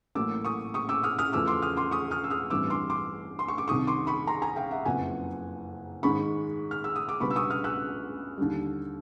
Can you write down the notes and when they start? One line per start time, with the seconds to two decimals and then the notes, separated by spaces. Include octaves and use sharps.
0.15 A1 A2 F#3 A#3 D6 E6
0.45 C#6 D#6
0.74 C#6 D#6
0.89 D6 E6
1.03 D#6 F6
1.19 D#6 F6
1.33 E2 C#3 F3 A3 C#4 D6 E6
1.47 C6 D6
1.62 D#6 F6
1.77 C6 D6
1.91 C#6 D#6
2.11 D#6 F6
2.24 E6
2.30 D#6 F6
2.50 A1 G2 E3 G3 C4 D6 E6
2.70 C6 D6
2.90 C6 D6
3.39 C6
3.48 C#6
3.58 D6
3.68 C2 C3 D#3 C#6 D#6
3.87 C6 D6
4.07 B5 C#6
4.27 A#5 C6
4.42 G#5 A#5
4.56 F5 G5
4.71 E5 F#5
4.86 F#1 F2 C#3 F#3 B3 F#5 G#5
6.03 G#2 D#3 G#3 B5 C#6
6.71 F6
6.84 E6
6.96 D#6
7.09 D6
7.20 C#2 B2 G3 B3 D4 B5 C#6
7.30 E6
7.36 C#6 D#6
7.50 D#6 F6
7.64 E6 F#6
8.38 D#2 D3 G3